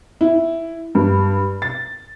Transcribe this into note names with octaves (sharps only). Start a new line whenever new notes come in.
E4
G2
A6